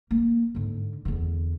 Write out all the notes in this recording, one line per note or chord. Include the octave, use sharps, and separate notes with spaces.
A#3
G#2 D3
E2 D3